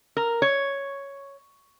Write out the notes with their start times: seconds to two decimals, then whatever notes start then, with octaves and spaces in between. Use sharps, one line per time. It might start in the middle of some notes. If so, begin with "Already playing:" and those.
0.17 A#4
0.42 C#5